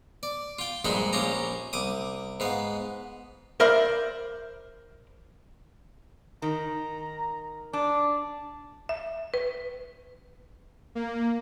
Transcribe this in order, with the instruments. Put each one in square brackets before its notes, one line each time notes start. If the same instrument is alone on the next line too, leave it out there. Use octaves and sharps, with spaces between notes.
[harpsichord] D5
F4 G5
A#1 G2 G#3 D#4 B5
A#1 C#4 F4 G4 A#5
C2 D6 D#6
G#2 B3 F5
[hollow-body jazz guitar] A#4 C5 D5 E5 F5 B5
[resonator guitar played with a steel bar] D#3 [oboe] A#5
[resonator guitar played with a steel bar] D4 [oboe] D5
[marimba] E5
B4
[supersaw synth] A#3